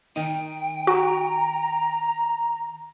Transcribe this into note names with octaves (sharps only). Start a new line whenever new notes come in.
D#3 D#4 G5
F#4 A#5